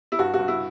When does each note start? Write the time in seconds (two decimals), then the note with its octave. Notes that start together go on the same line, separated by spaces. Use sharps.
0.12 E4
0.19 G2 F#4
0.34 F#4
0.39 G2
0.48 E4